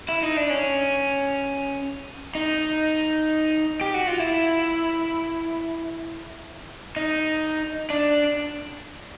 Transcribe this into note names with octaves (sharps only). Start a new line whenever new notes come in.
E4
D#4
D4
C#4
D#4
G4
F#4
F4
E4
D#4
D4